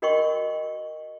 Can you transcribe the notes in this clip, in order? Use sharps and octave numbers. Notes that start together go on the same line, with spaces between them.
F#4 A#4 D#5 G5 C6 C#6